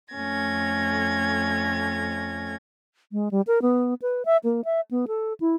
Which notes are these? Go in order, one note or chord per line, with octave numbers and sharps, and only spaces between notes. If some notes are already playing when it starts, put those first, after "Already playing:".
F2 A3 C#4 G#6 A#6
G#3
G3
A#4
B3
B4
E5
A#3
E5
B3
A4
E4